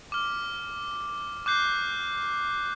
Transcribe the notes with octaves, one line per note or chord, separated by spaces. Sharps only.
D6 F6
D6 F#6 G6 C7